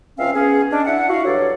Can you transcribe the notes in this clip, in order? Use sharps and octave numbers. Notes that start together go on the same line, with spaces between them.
C#2 F3 C4 C#4 E5 F5
B3 C#4 G#4
G#3 C#4 D4
D4 E4 E5 F#5
E4 F#4 F5
G2 F#3 A4 C#5 D5